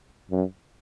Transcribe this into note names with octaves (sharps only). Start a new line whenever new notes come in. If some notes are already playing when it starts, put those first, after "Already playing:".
F#2